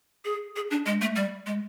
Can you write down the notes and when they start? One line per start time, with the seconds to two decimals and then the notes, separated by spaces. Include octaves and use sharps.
0.25 G#4
0.56 G#4
0.71 D4
0.86 G#3
1.01 A3
1.16 G3
1.46 G#3